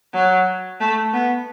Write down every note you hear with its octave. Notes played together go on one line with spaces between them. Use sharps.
F#3
A3
B3